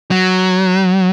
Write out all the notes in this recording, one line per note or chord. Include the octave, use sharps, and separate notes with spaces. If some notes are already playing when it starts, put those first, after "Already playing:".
F#3